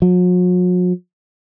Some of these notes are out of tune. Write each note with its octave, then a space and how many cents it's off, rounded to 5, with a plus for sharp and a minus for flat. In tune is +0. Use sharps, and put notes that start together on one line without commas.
F#3 -45